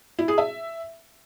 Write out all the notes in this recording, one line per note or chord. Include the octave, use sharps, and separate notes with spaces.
E4
G#4
E5